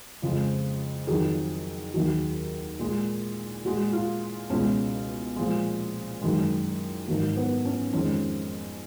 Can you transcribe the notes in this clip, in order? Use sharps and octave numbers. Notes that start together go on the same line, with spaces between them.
F2 C#3 F3 G#3
F2 D#3 F#3 G#4
D#2 D#3 F#3
A#2 G#3
A#2 G#3 F#4
F4
C#2 B2 G#3 C#4
A#2 F3 G#3
F#2 D#3 G#3
G#2 D#3 F#3 A#3
B3
C#4
F2 D#3 G#3 C#4